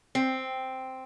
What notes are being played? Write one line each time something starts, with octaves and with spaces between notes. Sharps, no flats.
C4